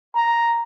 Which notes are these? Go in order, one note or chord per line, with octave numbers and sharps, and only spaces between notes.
A#5